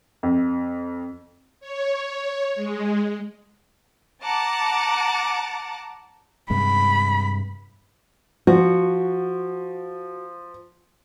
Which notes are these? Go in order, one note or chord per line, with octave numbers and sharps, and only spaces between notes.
F2
C#5
G#3
F#5 A5 A#5 D6
G2 C3 G#3 B5
F3 F#4